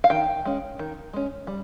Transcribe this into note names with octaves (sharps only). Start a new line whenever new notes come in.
F5
D#3 G5
G#3 C#4
D#3
G#3 C#4
G3